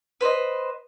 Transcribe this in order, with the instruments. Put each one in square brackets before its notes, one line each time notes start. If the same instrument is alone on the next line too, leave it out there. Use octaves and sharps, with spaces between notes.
[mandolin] B4 C5 D5 D#5